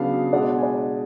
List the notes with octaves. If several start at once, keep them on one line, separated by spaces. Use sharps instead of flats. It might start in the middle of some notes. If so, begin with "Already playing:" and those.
Already playing: C#3 F#3 B3 D4 F5
B2 G#3 D4 D5 F#5
G#5
D5 F#5